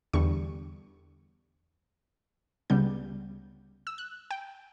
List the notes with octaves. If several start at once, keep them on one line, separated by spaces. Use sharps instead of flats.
E2 D3 G3 C#6
C#2 C#3 G3 B3 G6
E6
F#6
G5